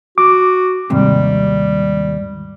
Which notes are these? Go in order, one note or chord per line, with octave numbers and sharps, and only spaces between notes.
F#4 D6
D#2 G#2 C3 G3